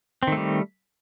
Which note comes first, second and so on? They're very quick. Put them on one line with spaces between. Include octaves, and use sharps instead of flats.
C4 D#3 A3 G3